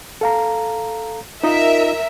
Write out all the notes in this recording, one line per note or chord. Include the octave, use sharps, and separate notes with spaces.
A4 F5 A#5
D#4 F4 A#4 D#5 E5